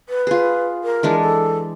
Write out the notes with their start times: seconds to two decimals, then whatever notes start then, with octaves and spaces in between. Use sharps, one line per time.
0.09 B4
0.27 F4 G#4
0.84 A#4
1.03 E3 G#3 D4
1.21 A4